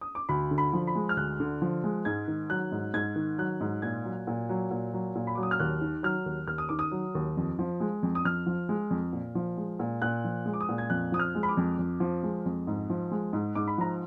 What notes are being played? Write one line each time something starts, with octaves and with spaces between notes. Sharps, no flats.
D#6
D6
D2 B5
D3
B5
F3
B5
G#3
F6
D2 F#6
D3
F3
G#3
G#2 G#6
D#3
F#3 F#6
G#2
G#2 G#6
D#3
F#3 F#6
G#2
A#2 G#6
F#3
A#2
F#3
A#2
F#3
A#2
B5
F#3 D6
D#6
F6
D#2 F#6
D#3
F#3 F6
D#2
D#2 F6
D#6
D#3 D6
D#6
F#3
D#2
F2
F3
G#3
F2
D#6
F2 F6
F3
G#3
F2
A#2
F3
G#3
A#2
A#2 F#6
F3
G#3
D6
D#6
A#2
G#6
F2 F#6
F3 D#6
F6
G#3
B5
D6
F2
F2
F3
G#3
F2
G#2
F3
G#3
G#2
G#2 D6
B5
F3 A#5